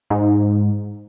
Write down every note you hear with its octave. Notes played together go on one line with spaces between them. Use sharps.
G#2